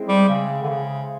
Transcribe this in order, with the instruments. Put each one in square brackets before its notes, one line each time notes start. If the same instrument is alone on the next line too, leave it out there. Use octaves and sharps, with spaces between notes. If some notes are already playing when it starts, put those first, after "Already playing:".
Already playing: [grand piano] G#3 C4 E4 G#4
[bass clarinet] G3
C#3
D3
C#3